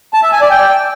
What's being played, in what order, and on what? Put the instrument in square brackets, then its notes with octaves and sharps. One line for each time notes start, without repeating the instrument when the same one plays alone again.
[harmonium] A5
E5
G#5
D5
G5